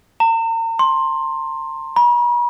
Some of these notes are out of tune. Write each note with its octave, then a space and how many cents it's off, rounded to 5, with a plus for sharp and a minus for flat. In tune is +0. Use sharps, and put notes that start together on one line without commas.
A#5 -40
C6 +15
B5 -45